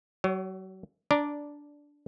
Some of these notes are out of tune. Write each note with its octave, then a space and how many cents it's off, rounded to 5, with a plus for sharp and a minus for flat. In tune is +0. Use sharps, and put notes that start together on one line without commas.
F#3 +35 C#5 +0
D4 -10 D5 +0 A#5 +0